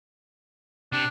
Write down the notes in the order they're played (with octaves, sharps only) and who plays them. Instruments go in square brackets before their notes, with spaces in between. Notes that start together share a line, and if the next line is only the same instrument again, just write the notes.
[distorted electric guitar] C3 [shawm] D4